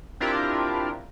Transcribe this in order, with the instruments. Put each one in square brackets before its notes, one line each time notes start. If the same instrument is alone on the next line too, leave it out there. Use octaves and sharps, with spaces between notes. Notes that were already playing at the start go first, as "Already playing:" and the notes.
[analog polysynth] C4 D4 E4 F4 G4 A#4